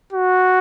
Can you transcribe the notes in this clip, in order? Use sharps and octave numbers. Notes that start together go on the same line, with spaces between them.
F#4